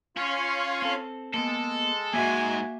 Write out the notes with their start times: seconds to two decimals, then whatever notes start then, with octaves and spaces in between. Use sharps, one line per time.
0.17 C#4 F4 C#5 F5
0.82 C4 A4
1.34 G#3 A#3 B3 A4
2.13 E2 G#2 A#3 F#4 E5 G#5